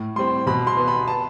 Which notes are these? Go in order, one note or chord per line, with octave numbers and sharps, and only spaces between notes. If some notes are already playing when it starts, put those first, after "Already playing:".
Already playing: A2
G3 C4 C6
B2 B5
C6
B3
B5
A5